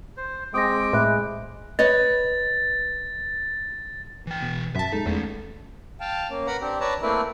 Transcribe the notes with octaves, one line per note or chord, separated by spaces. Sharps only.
C5
G#3 C4 G5 D6 D#6 A#6
A2 E5 B5 F#6
B4 C#5 D#5 A6
E3 G5
B2
F#2 E5 A5
G#3 D#4 A4
E2 A3 C#4
F5 G5 A5
A#3 C#4
A#4 B4 F#5 A#5 B5
C4 D4 G4
B4 C#5 D5 A5 A#5
A3 A#3 C4 E4 A#4 B4